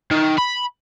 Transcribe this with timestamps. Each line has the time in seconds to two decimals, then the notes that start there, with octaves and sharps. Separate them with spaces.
0.11 D#3
0.38 B5